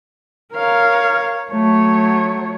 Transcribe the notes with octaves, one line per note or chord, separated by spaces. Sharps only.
A#4 C#5 F5
F#3 A3 C#5